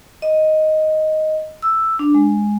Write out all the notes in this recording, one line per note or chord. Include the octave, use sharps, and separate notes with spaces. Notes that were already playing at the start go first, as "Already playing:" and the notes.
D#5
E6
D4
G#3